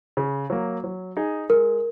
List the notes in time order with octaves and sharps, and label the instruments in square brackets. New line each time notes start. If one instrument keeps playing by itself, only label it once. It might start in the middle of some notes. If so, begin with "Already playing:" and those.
[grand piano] C#3
F#3 A#3
F#3
D#4 G#4
[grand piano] G#3 [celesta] A#4